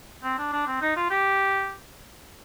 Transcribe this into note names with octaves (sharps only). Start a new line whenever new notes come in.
C4
D4
D4
C4
D#4
F4
G4